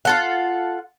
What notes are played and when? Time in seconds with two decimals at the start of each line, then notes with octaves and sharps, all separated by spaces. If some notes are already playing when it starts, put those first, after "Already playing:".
0.05 F4 A4 F#5